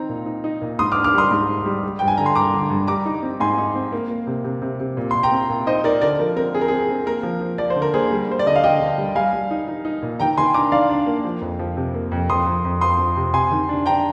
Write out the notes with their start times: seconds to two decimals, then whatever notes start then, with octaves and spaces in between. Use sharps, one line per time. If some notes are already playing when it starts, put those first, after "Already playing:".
Already playing: D#3 C4 D#4 A#5
0.09 A#2
0.26 D#4
0.44 D#4
0.61 A#2
0.79 G#2 C6 D#6
0.92 D6 F6
0.96 D4
1.04 D6 F6
1.14 G3 C6 D#6
1.31 G#2
1.48 G#2
1.66 G3
1.83 G3
1.99 G2 G5
2.08 G#5
2.17 D3 A#5
2.26 C6
2.35 G2 A#5 D6
2.54 D3
2.70 G2
2.87 G3 A#5 D6
3.06 D#4
3.23 C4
3.40 G#2 G#5 C6
3.58 D#4
3.75 C4
3.92 A#3
4.10 A#3
4.27 C3
4.44 C3
4.62 C3
4.80 C3
4.97 A#2
5.11 A#2 C6
5.23 G5 A#5
5.32 C4
5.49 A#2
5.67 D#4 C5 D#5
5.84 D#4 A#4 D5
6.01 D3 A#4 D5
6.19 F3 A#4
6.36 C4 A#4
6.54 C4 G#4
6.61 A#4
6.68 C4 G#4
6.89 C4
7.06 A#3 A#4
7.23 F3
7.41 F3
7.58 F3 D5
7.70 C5
7.76 D3
7.82 A#4
7.94 A#3 G#4 C5
8.11 G3
8.29 G3 C5
8.39 D5
8.46 D3 D#5
8.56 F5
8.64 D3 D#5 G5
8.80 D3
8.98 G3
9.15 G3 F5 G#5
9.33 G3
9.51 D#4
9.68 D#4
9.85 D#4
10.02 A#2
10.20 D#3 G5 A#5
10.37 D#3 G#5 C6
10.54 D4 A#5 D6
10.72 D#3 D5 F5
10.89 D4
11.07 A#3
11.24 F3
11.41 F2
11.59 F3
11.77 C3
11.94 A#3
12.12 F2
12.30 F2 C6 D#6
12.46 F2
12.64 F2
12.81 F3 C6 D#6
12.98 F3
13.16 C3
13.34 C3 G#5 C6
13.52 D#3
13.69 D4
13.86 D4 G5 A#5